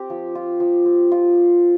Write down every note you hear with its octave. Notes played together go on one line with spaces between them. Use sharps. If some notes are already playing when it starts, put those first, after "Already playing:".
Already playing: C4 G4
F3
F4
F3
C4
F3 F4